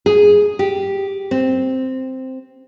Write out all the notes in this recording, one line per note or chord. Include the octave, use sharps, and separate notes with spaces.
G#4
G4
C4